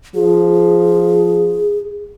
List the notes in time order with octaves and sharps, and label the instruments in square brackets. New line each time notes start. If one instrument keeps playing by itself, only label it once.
[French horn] F3 [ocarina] G#4